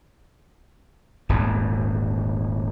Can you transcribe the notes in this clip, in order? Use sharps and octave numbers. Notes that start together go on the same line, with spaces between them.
D#1 G#1 E2